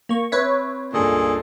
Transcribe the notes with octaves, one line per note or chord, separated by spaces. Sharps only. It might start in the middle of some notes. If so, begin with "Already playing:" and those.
A#3 C#6
C4 B4 C#5 E5
C#2 G2 A#2 G#4 A4